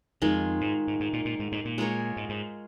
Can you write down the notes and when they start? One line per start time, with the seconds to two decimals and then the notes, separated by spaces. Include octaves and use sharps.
0.22 F2 D#3 G#3 F4
0.61 G#2
0.87 G#2
1.00 G#2
1.13 A#2
1.25 A#2
1.39 G#2
1.52 G#2
1.65 A#2
1.78 G#3 F4 A#4 C#5
2.17 G#2
2.29 G#2